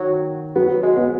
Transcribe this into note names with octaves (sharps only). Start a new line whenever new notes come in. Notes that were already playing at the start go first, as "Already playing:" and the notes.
Already playing: D#3 F#3
F#3 B3
G#3
B3